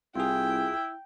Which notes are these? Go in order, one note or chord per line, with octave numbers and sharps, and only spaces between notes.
C2 E4 F4 G#4 G5